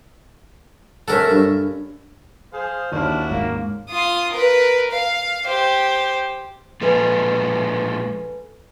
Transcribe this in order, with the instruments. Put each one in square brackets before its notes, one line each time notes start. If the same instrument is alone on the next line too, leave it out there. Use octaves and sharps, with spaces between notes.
[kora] C#4 E5 F#5 [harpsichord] A4 A#4
[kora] G2
[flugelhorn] G#4 [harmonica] C5 F5
[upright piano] D#2 F6 [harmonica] C#4 E4 F#4 [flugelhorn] D4
[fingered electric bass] G#2 [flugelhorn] A#3
[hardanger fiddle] F4 D#6
A#4 B4
F5
G4 C5
[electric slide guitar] A#2 F3 G#3 [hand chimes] A4 B4 G#5